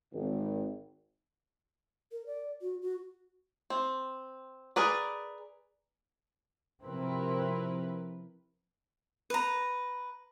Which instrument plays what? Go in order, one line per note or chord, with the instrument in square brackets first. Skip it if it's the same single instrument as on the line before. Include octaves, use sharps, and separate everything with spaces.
[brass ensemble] G#1
[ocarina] A#4
D5
F#4
F#4
[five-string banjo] C4
G#4 A#4 B4 D5
[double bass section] C3 F3 C4 [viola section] E4 A#4 B4
[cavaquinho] B4 A#5